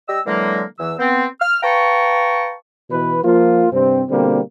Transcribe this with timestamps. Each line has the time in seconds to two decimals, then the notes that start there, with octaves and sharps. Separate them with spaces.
0.08 G3 G4 D#5 E6
0.26 D3 E3 F#3 G#3 A#3
0.79 E2 E3 E6
0.99 B3 C4
1.40 F6
1.63 B4 F5 G5 A5 A#5 C#6
2.90 B2 E3 B4
3.23 F3 A#3 F4
3.72 G2 C3 C4
4.09 B2 D3 G3 A#3 C4